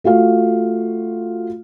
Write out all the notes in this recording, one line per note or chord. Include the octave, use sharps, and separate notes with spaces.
A3 F4 F#4 F5